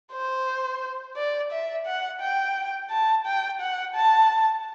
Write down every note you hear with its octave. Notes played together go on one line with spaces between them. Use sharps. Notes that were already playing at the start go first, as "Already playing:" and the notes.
C5
D5
E5
F#5
G5
A5
G5
F#5
A5